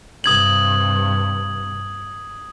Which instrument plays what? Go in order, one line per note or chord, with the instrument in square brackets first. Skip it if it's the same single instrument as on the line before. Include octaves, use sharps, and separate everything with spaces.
[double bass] G2 C3 [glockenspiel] D#6 G#6 F#7